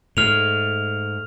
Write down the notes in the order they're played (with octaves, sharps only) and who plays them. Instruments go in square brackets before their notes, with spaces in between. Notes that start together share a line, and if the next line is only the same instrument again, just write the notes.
[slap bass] G#2 [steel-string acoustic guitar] A3 [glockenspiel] F6 F7